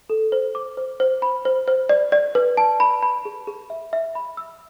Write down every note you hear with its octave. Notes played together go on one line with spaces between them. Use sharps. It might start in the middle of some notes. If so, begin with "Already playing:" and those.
A4
C5
D6
C5
C5
B5
C5
C5
D5
D5
B4
A5
B5
B5
G#4
G#4
E5
E5
B5
E6